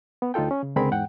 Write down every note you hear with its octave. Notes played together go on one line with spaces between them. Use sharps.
B3
D2 D#4 F4 A4 G5
C#4
C#3
C#2 D3 C4 G#4 A#4 B5
E2 G#2 F#5 G5